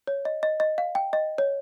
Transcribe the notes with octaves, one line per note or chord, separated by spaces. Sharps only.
C#5
D#5
D#5
D#5
F5
G5
D#5
C#5